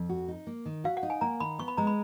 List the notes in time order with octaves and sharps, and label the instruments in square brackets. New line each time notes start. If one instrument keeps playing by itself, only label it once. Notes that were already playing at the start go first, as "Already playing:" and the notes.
Already playing: [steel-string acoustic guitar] F2
F#4
D#4
A#3
D#3
[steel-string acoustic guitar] F#4 [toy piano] F5
[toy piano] F#5
[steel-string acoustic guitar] D#4
[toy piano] G#5
[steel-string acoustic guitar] A#3 [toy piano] A#5
[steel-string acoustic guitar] D#3 [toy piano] B5
[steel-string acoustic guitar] B3 [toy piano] C#6
[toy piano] B5
[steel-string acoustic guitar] G#3 [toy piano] A#5
[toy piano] B5